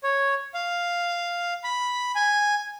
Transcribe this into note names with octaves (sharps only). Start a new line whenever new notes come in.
C#5
F5
B5
G#5